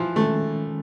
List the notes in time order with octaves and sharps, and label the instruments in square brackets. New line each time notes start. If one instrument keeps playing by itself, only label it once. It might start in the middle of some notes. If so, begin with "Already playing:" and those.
Already playing: [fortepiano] E3 F3
[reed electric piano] D#3 G#3 C#4 [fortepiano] A3